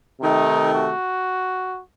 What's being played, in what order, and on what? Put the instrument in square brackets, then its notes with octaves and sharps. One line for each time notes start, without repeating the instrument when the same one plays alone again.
[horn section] C3 D#3 A3 D#4
F#4